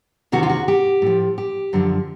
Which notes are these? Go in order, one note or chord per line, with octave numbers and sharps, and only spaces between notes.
E2 C3 D#3 F#4
F4
F#4
G4
A2 F3
G4
F#2 D3 F3